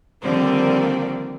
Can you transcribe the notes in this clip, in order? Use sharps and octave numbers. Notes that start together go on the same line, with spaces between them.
D3 D#3 F3 G3 A#3 C4